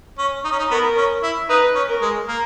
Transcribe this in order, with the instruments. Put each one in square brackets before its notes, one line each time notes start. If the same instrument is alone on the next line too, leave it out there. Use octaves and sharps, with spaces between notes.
[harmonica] C#4
D#4
C#4
D#4
[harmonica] B3 [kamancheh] A#4
[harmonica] C#4
E4
[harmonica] D#4 [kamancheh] B4
[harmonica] C#4
[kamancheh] A#4
[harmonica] G#3
A#3